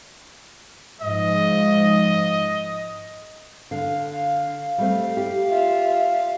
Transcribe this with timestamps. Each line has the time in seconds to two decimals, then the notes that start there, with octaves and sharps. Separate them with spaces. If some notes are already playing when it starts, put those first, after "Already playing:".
1.01 G#2 F3 D#5
3.71 D3 F5
4.78 G3 A3 C4
5.17 G4
5.50 F4 E5